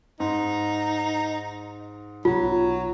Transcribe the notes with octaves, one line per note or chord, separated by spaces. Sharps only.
G#2 D#4
B1 B2 F#3 F4